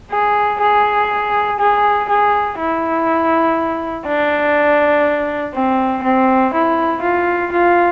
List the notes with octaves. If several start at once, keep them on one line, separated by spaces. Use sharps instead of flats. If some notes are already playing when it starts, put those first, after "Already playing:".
G#4
G#4
G#4
G#4
E4
D4
C4
C4
E4
F4
F4